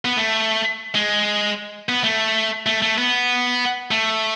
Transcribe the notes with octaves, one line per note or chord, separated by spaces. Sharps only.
B3
A3
G#3
B3
A3
A3
A3
B3
A3